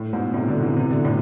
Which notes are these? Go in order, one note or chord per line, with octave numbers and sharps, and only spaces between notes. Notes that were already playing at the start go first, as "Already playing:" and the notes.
Already playing: A2
G#2 B2
A2 C3
B2 D3
C3 E3
C3 E3
B2 D3
A2 C3